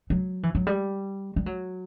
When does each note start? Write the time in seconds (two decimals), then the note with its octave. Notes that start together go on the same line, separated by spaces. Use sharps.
0.10 F#3
0.43 E3
0.55 F#3
0.67 G3
1.36 G3
1.46 F#3